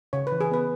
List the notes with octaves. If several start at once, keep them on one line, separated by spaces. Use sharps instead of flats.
C#3 C#5
B4
E3
G#4
B3 B4